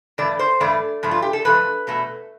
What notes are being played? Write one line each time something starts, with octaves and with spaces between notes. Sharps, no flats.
G2 E3 A3 D5
C5
G2 E3 A3 D5
G2 F3 A3
F4
G4
A4
G2 F3 A3 B4
E2 B2 A3